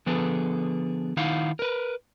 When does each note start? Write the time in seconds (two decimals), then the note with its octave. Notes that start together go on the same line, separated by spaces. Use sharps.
0.06 D3 F3 B3 G#4 A4 B4
1.17 D#3 D#4 E4 F5 F#5
1.59 A#4 B4